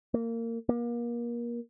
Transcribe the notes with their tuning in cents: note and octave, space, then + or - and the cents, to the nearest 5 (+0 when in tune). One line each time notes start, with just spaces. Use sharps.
A#3 -20
A#3 +30